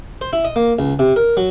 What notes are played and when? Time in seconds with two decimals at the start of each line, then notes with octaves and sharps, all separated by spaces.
0.21 C5
0.33 E4
0.45 D#5
0.56 A#3
0.79 C#2
0.99 C3
1.16 A#4
1.37 F#3